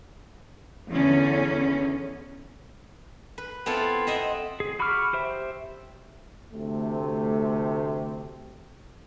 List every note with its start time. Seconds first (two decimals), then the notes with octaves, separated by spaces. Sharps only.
0.90 E2 D3 C#4
3.38 B4
3.66 B3 C4 E4 F4 A4
4.07 C4 D#5 E5 F#5
4.60 G#4
4.79 F#4 B5 C#6 D6 F6
5.13 G4 C5 E5
6.54 D2 C3 A3